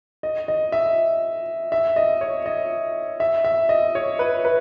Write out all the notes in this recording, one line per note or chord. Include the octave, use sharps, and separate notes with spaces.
D#5
D#5
E5
E5
D#5
C#5
D#5
E5
E5
D#5
C#5
B4
B4